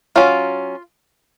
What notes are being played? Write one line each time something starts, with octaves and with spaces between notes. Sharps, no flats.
F#3 C#4 F4